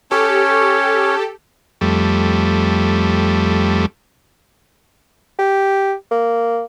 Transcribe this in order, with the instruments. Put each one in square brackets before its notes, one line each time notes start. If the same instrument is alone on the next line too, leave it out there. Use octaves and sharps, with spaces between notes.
[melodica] C#4 C#5 [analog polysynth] G4 A4
[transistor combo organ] F2 G3 A3
[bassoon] G4
A#3